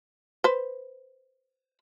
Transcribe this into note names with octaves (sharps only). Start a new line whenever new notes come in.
B4 C5